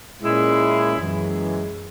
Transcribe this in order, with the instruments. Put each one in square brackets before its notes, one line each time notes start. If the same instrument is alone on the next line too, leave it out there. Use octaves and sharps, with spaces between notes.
[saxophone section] A#2 G#3 C#4 E4
F#2 E3 G#3